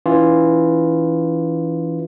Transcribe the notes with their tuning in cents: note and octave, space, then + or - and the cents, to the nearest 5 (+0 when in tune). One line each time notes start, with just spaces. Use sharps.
E3 +0 C#4 +45 F4 +0